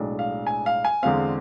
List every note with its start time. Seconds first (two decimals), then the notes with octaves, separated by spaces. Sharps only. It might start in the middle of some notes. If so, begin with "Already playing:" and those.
Already playing: B1 A2 G#3 D4
0.19 F5
0.47 G#5
0.66 F5
0.85 G#5
1.03 E2 D3 G#3 C4 F5